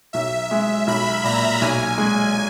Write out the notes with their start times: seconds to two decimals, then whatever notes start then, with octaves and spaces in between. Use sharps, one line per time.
0.13 B1 E5
0.51 G#3
0.87 B1 B5
1.24 A#2 A#5
1.61 B1 G#5
1.98 G#3